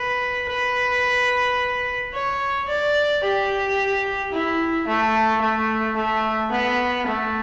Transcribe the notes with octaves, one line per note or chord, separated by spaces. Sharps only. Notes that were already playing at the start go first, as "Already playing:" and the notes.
Already playing: B4
B4
C#5
D5
G4
E4
A3
A3
A3
B3
A3